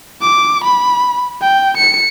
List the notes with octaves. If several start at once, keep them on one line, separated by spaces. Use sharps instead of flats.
D6
B5
G5
C#7